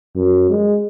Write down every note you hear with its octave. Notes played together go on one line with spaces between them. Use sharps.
F#2
G#3